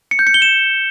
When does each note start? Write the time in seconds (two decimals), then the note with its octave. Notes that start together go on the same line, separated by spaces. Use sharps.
0.11 C#7
0.19 G6
0.27 C#7
0.34 G7
0.42 E7